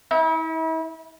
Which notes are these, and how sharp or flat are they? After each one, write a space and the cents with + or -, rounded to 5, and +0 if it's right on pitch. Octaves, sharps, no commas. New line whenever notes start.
E4 -40